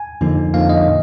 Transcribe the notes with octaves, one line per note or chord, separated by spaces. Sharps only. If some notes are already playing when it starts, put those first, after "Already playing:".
Already playing: G#5
F2 D3 F3 A#3 D#4
F2 D3 F3 A#3 D#4 F5
D#5
A#2